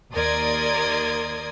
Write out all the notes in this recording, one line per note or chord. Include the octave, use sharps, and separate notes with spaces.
D#2 A#4 D5 C6 D#6 G#6